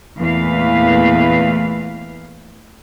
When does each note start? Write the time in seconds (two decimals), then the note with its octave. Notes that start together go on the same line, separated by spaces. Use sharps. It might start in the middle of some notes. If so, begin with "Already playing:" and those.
0.18 E2 A#2 E3 A3 B4 F5